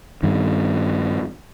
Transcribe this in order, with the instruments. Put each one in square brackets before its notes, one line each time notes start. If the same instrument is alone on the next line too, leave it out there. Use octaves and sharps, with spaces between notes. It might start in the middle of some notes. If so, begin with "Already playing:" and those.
[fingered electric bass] G2 D#3